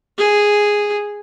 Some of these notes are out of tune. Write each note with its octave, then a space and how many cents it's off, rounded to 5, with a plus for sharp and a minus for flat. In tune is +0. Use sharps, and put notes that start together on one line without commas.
G#4 -5